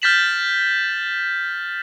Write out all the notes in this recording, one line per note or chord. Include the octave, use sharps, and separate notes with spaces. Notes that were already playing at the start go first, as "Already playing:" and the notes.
F6 G6 A6 B6 E7 F#7